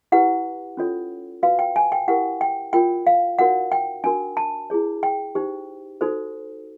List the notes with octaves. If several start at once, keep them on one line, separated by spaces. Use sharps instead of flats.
E4 G4 B4 F#5
C#4 F4 A4 C#5
F#4 B4 F5
G5
G#5
G5
E4 G4 A#4 F#5
G5
F4 A#4 C#5 G5
F5
D#4 F#4 A#4 C#5 F#5
G5
D4 F#4 A#4 G#5
A5
E4 G#4 C#5
G5
D#4 G4 C5
D#4 F#4 A4 C5